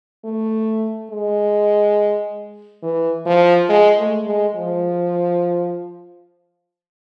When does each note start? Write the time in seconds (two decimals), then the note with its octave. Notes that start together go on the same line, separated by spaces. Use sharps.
0.25 A3
1.10 G#3
2.83 E3
3.26 F3
3.69 G#3
3.98 A3
4.27 G#3
4.55 F3